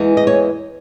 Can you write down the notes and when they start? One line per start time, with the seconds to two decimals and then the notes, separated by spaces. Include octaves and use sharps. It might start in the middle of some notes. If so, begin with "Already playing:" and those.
Already playing: E2 E3 G#3
0.17 D#5
0.27 C#5